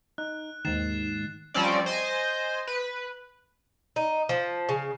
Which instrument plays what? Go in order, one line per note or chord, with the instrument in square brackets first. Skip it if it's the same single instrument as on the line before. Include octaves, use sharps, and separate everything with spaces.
[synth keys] D#4 [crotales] F#6
[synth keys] D#2 G#2 D#3 [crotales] A6 C7 E7
[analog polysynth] F3 G3 C4 C#4 D5
C5 D#5 G#5
B4
[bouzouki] D#4
F3
C#3